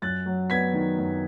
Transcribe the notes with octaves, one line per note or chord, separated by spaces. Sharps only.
F#2 F#6 A6
F#3
B3 G#6 B6
D#3
F#2